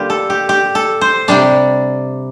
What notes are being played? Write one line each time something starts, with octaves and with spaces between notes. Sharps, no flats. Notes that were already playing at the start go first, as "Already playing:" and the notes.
Already playing: D3 G3 A#3 F4 G4
A4
G4
G4
A4
C5
C3 G3 D4 D5